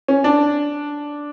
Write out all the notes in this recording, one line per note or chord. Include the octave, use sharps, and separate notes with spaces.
C#4
D4